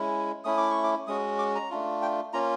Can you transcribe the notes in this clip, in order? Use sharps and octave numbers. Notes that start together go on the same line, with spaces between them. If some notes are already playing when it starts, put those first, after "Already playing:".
Already playing: G#3 C#4 E4
A3 C#4 E4 D#6
D6
C#6
D6
G#3 C#4 F#4 D#6
D6
A#5
A3 D4 F4
G5
A#3 C#4 F4 A#5